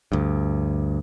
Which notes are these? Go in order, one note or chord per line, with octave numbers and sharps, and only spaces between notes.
D2 G2